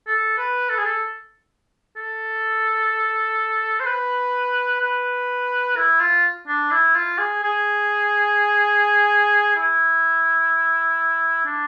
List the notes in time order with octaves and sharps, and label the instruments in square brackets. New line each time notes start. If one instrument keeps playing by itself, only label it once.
[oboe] A4
B4
A4
G#4
A4
A4
C5
B4
B4
E4
F4
D4
E4
F4
G#4
G#4
E4
D4